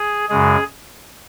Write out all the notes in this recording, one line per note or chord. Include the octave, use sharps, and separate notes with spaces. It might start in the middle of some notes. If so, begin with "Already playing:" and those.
Already playing: G#4
F#2 C#3 G#3 G#4